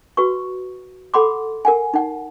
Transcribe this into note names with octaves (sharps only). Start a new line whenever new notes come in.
F#4 B4 C#6
A4 F#5 B5 C6 D6
A#4 F#5 G#5
D#4 F#5